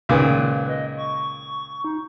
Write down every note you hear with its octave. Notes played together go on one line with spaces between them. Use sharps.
C#2 A#2 D#3 B4
D#5
C#6
D#4